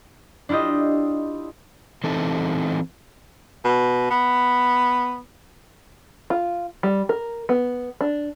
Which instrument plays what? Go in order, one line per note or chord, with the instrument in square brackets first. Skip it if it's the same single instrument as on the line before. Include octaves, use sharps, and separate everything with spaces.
[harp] D4 E4 F4 G4 D#5
[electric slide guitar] E3 C4 D#4 A4
[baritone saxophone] B2
B3
[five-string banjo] F4
G3
A#4
B3
D4